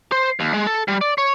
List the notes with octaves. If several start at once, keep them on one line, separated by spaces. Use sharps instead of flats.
C5
D#2
G#3
A4
G3
D5
C#5